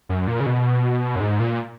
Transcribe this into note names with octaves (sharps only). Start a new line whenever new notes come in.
F#2
A#2
C#3
B2
F#2
G#2
A#2